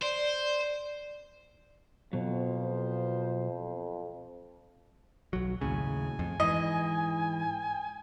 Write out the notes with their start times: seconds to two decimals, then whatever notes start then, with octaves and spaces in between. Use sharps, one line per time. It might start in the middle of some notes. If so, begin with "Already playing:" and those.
0.02 C5 D5
2.13 F2 B2 F#3 B3 F4 C5
5.33 B1 F#3
5.61 D#2 A2 C#3 G#5
6.19 F2
6.40 G#2 E3 D#5